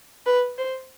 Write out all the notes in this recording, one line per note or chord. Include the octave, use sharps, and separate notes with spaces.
B4
C5